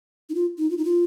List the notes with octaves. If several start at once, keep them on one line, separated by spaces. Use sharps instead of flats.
D#4
F4
D#4
F4
D#4
F4